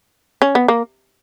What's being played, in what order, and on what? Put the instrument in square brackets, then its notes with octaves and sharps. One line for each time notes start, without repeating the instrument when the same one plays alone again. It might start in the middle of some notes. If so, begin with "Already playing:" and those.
[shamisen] C#4
B3
A#3